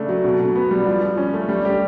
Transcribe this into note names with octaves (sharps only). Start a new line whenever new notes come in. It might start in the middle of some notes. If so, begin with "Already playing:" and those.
Already playing: C#3 A3 D4
F#3
B2
B2
B3
G3
F3
F3
C#4
A3
G3
G4